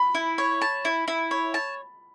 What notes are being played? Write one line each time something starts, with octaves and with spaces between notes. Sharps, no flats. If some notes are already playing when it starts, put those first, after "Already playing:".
Already playing: B5
E4
C#5
A5
E4
E4
C#5
A5